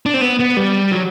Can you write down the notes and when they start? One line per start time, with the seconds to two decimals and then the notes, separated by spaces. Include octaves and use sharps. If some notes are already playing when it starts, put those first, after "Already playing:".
0.06 D4
0.14 C4
0.21 B3
0.40 B3
0.57 G3
0.92 F#3